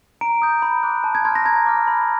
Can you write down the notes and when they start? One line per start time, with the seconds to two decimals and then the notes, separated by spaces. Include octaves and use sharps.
0.21 A#5 D7
0.42 D#6 G6
0.62 B5
0.83 D6 F#6
1.04 A5
1.15 G#6
1.25 C6 F6 G#6
1.35 A#6
1.45 A#5 G#6
1.66 D6 F6
1.87 B5